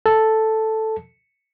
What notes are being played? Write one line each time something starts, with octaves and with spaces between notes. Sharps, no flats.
A4